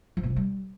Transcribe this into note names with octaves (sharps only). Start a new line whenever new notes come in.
F3
B2
C3
G3